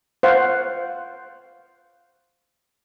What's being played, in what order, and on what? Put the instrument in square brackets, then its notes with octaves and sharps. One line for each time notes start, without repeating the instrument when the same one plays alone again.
[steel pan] C5 F5 F#5